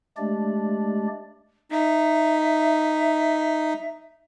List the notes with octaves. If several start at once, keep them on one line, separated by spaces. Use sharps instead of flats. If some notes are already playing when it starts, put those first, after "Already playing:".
G#3 A3 D4 G4 D5
D#4 E5